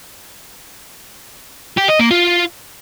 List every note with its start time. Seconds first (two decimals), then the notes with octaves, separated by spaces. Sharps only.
1.78 G4
1.89 D#5
2.00 A#3
2.11 F4